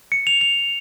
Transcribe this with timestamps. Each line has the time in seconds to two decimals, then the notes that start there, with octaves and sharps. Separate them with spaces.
0.12 C#7
0.27 F7
0.41 F7